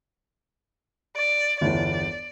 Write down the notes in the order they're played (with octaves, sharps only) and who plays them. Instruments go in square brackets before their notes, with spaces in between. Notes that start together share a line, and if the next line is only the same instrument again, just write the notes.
[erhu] D5
[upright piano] G1 E2 [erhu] D5